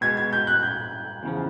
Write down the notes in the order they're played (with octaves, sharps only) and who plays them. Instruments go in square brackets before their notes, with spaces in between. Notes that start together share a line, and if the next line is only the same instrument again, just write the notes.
[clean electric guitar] B2 G#3 B3 [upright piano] G#6
[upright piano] G#6
G6
F#6
G6
[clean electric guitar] E2 C#3 F3